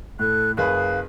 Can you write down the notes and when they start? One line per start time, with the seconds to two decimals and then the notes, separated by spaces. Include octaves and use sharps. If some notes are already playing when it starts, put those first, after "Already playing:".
0.19 A2 A4 F#6
0.57 F#1 G#4 B4 F5 F#6